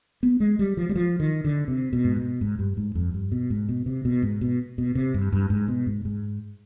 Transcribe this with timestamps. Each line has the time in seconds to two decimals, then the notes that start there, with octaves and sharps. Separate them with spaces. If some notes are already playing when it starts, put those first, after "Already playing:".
0.23 B3
0.40 G#3
0.59 G3
0.77 F3
0.89 G3
0.95 F3
1.20 D#3
1.44 D3
1.68 C3
1.93 B2
2.05 G#2
2.17 B2
2.41 G#2
2.59 G2
2.77 G#2
2.95 F2
3.14 G2
3.32 B2
3.50 G#2
3.69 B2
3.86 C3
4.05 B2
4.23 G#2
4.41 B2
4.78 B2
4.95 C3
5.14 G2
5.32 G2
5.50 G#2
5.68 B2
5.86 G#2
6.05 G#2